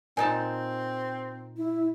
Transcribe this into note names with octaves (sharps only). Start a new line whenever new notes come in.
A#2 C4 D#4 G#5 A5
E4